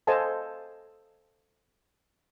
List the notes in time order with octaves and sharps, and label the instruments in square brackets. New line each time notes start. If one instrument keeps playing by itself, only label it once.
[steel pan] A4 C5 D#5 F5 G#5 A5